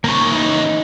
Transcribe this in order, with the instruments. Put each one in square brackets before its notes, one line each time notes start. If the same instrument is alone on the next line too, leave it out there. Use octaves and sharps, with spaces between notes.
[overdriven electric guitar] D#2 C#3 [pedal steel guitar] A#3 C#6
[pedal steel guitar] E3 D#4